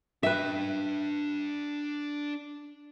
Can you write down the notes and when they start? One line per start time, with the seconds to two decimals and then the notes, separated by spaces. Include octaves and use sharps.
0.23 D4 B4 E5 G5